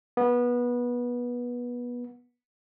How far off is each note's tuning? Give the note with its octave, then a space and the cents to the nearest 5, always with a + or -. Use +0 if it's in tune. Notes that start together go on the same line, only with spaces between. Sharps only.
B3 -20